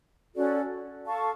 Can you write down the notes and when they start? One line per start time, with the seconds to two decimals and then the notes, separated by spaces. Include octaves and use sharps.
0.35 C#4 F#4 A4 D5
1.06 A4 F5 A5 C#6